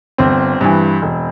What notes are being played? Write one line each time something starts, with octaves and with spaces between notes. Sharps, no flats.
G1 C4
G2 E3
E1